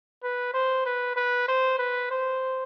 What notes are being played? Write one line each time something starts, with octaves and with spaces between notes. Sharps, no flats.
B4
C5
B4
B4
C5
B4
C5